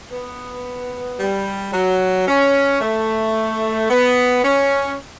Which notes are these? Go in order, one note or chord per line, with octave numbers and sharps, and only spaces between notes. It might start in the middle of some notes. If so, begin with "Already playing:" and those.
B3
G3
F#3
C#4
A3
B3
C#4